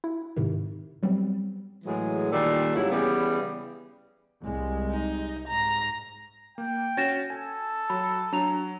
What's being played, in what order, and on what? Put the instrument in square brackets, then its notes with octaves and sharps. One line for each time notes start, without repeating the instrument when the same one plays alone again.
[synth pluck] E4
G#2 C3 D#3
F#3 G3 B3 C4
[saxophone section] A2 E3 F#3 G#3
A#2 D#3 G3 A4 D5
G#2 C#3 F#3 G3 E4
C#3 E3 G3 B3
[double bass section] C2 G#3
[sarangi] D#4
[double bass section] G#2 [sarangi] A#5
[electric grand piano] A#3 [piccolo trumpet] G5
[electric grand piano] C#4 F#4 [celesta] A6 A#6 E7
[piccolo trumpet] A4 [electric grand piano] G#5
[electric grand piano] F#3 [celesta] B5
[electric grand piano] F#3 [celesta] D4 A#5 F7